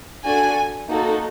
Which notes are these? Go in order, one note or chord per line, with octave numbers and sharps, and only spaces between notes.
D4 F#4 A4 G#5
A#3 D#4 F#4 A4